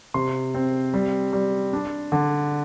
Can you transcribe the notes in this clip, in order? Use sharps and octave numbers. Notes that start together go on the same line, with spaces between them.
C3 C6
C4
G3
G3
D4
D3